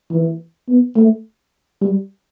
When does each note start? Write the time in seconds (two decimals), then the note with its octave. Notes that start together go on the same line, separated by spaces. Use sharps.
0.11 E3
0.69 B3
0.97 A3
1.82 G3